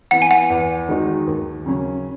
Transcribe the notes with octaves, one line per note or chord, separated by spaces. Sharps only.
E3 B3 F#5
G#5
F#5
E2
D#3 G#3 D#4 F#4
D#2
C#3 F#3 C#4